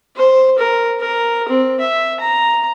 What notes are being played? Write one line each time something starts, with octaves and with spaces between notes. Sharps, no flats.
C5
A#4
A#4
C4
E5
A#5